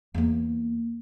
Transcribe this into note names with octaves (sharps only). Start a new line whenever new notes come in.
E2 A#3